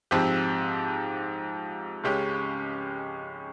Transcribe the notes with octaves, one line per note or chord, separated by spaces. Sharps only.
G#2 F3 C4 G4
C#2 C#3 G#3 C#4 G4